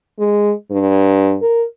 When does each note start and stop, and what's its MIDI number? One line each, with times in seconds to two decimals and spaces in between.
0.19 0.52 56
0.71 1.37 43
1.42 1.65 70